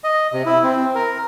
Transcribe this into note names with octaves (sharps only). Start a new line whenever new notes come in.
D#5
C3
E4
C4
A#4